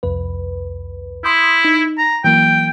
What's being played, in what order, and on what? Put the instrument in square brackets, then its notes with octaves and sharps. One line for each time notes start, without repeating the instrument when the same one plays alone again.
[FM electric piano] C2 F2 B4
[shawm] E4 [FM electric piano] C6 D#6 G6
[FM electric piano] D#4
[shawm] A#5
[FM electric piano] E3 F#3 A#3 [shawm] G5